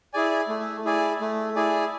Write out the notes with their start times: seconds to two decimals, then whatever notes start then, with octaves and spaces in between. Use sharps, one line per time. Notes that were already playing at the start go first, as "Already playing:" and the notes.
0.14 E4 G#4 D5 G#5
0.48 A3
0.85 E4 G#4 D5 G#5
1.21 A3
1.56 E4 G#4 D5 G#5